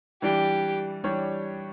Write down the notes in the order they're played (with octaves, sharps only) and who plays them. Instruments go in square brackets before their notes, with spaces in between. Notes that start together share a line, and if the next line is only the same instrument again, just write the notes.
[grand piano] E3 G3 D4 [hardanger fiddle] G4
[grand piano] E3 G3 D4 G4 C#5